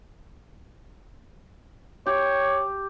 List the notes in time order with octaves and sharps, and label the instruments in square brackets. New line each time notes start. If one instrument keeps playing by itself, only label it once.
[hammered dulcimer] G4 [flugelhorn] C#5